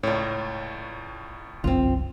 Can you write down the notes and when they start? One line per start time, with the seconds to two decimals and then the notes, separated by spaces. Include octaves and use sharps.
0.03 C#2 A2 C#5 D5
1.64 G1 C2 F#2 C4 F4